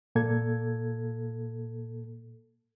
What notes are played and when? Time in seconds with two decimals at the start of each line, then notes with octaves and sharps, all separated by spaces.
0.15 A#2 A#3 A4 G#6